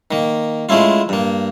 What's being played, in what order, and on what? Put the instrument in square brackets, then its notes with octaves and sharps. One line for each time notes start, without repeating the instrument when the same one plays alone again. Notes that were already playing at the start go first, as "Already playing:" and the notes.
[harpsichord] D#3 A#3
G#3 A3 C#4 E4 F4
G2 A#3